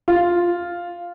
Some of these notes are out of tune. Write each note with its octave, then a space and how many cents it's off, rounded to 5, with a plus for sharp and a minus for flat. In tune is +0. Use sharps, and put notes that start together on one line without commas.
F4 +0